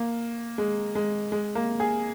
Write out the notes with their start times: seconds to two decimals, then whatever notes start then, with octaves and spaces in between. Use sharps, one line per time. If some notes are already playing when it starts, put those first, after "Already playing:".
Already playing: A#3
0.58 G#3
0.95 G#3
1.32 G#3
1.55 A#3
1.80 G#4